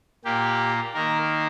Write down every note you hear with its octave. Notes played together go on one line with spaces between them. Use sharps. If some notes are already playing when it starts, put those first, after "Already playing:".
A#2 A#3 G4
D#3 A#3 A#4